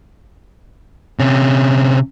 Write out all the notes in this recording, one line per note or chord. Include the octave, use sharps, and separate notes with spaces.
C3 C#4